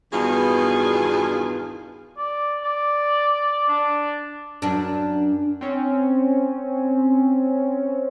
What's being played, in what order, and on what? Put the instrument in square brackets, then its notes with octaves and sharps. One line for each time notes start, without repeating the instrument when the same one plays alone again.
[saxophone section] E2 G2 B2 D#3 F4 G#4
[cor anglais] D5
D5
D4
[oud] F#2 D4
[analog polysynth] C4 C#4